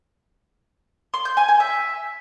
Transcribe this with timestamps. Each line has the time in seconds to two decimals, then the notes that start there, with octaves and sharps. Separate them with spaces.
1.14 C6
1.25 G6
1.37 G#5
1.48 G#5
1.60 E5